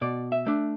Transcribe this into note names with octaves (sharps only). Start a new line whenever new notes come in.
B2 D5
E5
A3 D4